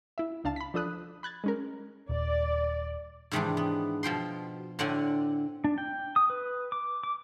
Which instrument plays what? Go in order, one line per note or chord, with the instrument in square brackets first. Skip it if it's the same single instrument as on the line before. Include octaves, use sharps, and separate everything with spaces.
[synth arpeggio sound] E4 E5
C#2 D4 F5 A5
B5 B6
F3 D4 A4 D#6 F#6
B5 F#6 G#6 A6
G#3 C#4 A#4
[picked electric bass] D#1 [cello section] D5
[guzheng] G#2 C3 D#3 E3 G#3 D4
B3
B2 F3 G5 C6
A2 D3 C4 D5 F#5 G#5
[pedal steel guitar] D4
G5
D#6
B4
D6
D6